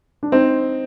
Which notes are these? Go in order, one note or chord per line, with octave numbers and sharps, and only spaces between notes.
D4
C4 D#4